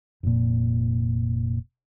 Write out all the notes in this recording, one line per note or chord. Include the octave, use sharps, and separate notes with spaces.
F1 A#2